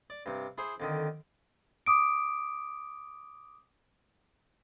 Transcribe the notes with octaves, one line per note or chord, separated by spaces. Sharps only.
D5
G2 C3
E4 G#4 C5
F2 D3 D#3
D6 D#6 D7